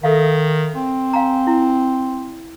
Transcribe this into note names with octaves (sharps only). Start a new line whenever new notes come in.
D#3 A4 E5 F5
C4
F5 G#5 A#5
E4